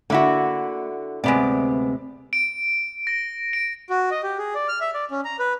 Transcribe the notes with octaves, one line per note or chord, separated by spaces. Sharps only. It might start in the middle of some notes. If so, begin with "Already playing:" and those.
D3 A#3 E4 F#4
D2 C3 G#3 B3 C4 D5
D7
A#6
D7
F#4
D#5
G4
G#4
D5
F6
E5
D5
C#4
A#5
B4